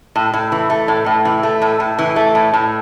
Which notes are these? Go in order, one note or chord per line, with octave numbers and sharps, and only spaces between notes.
A2
A2
E3
A3
A2
A2
E3
A3
A2
A2
E3
A3
A2
A2